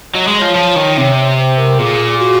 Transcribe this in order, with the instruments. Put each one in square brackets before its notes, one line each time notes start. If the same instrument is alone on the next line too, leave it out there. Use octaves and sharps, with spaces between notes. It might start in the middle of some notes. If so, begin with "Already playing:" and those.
[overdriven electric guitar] F#3 [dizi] D#5
[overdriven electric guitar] G#3
[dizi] D#5
[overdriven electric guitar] F3 [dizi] C#5
[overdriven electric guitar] F3
D#3
C3
[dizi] C5
A#4
[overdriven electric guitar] A#2 [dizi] G#4
[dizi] F#4